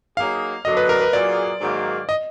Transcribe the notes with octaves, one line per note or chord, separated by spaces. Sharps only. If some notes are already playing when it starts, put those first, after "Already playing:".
F#3 A#3 D#4 G#4 F5
F#2 D3 F#3 B3 D4 D#5
B4
A#4
B4
A#2 F#3 A#3 F4 G#4 D5
G#2 D#3 F#3 A#3
D#5